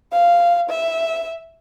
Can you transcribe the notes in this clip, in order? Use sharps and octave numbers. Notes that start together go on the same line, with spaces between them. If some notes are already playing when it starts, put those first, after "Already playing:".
F5
E5